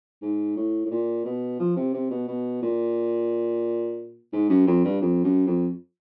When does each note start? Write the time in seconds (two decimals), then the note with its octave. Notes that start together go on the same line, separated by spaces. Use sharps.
0.22 G#2
0.56 A2
0.85 A2
0.90 A#2
1.25 B2
1.59 F3
1.76 C3
1.94 C3
2.10 B2
2.28 B2
2.62 A#2
4.32 G#2
4.50 F#2
4.67 F2
4.85 G2
5.02 F2
5.24 F#2
5.47 F2